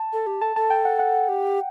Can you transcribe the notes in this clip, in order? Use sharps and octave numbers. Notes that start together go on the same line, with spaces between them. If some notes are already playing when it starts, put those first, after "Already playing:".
Already playing: A5
A4
G4
A4 A5
A4 A5
G5
F#5
F#5
G4